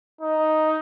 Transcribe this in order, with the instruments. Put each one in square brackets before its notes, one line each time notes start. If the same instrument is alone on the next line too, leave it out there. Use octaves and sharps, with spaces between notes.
[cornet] D#4